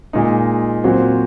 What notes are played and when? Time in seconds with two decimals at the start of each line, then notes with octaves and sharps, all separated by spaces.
0.13 A#2 G#3 D#4
0.84 A#2 F#3 C4 F#4 C5